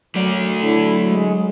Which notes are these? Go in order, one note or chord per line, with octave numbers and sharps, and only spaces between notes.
F#2 F#3 A3 D5
D3 E4
G#3